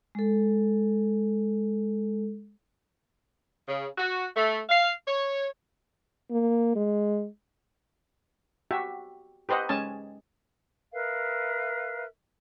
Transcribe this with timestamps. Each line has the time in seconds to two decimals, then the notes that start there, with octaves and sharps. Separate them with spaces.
0.15 G#3 A4
3.68 C#3
3.98 F#4
4.36 A3
4.69 F5
5.07 C#5
6.31 A#3
6.76 G#3
8.71 F#4 G4 E5
9.49 G4 B4 C5 D#5 F#5
9.69 G#3 C#4 G#5 A5
10.93 A#4 B4 E5 F5